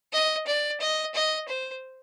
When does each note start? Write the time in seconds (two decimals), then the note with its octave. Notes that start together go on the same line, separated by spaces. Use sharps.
0.12 D#5
0.47 D5
0.80 D#5
1.14 D#5
1.48 C5